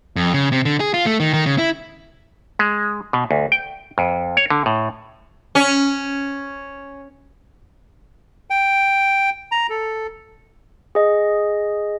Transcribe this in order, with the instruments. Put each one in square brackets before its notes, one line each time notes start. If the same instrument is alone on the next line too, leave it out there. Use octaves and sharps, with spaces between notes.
[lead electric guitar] F2
C#3
C3
D3
G#4
F4
A3
D#3
D#3
C#3
E4
[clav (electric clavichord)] G#3
B2
D2
G5
F2
C#5
D3
A2
[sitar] C#4
[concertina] G5
A#5
A4
[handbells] G#4 D#5